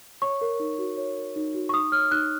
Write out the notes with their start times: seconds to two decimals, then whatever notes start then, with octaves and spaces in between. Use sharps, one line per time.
0.22 C#5 C#6
0.41 A#4
0.60 D#4
0.78 F#4
0.97 C#5
1.18 A#4
1.36 D#4
1.55 F#4
1.69 C#6
1.73 D#4 D#6
1.92 C#5 F6
2.11 D#4 F#6